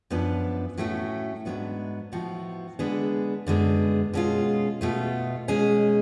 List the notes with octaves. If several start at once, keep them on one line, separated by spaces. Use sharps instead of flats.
F#2 F3 B3 D4
A2 F#3 A3 C#4 F#4
G#2 F#3 B3 D4
A2 F3 B3 F#4
D3 G#3 B3 D4 G#4
F#2 D3 G#3 B3
B2 G#3 C#4 F4
B2 A3 F4
B2 G#3 C#4 G#4